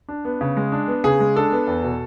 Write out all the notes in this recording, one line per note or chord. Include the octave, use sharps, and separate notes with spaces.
D4
B3
C#3
G#3
D4
B3
C#3 G#4
G#3
D4 A4
B3
E2
B2